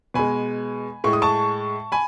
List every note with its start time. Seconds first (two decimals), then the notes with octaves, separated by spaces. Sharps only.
0.14 B2 G#3 G#5 B5
1.04 A2 G#3 C#6
1.13 D#6
1.22 A5 C#6
1.92 G#5 B5